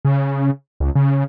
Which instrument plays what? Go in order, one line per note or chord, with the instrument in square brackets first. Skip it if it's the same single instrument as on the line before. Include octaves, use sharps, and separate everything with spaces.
[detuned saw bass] C#3
C#2
C#3